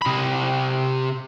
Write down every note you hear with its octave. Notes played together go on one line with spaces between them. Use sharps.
C3 B5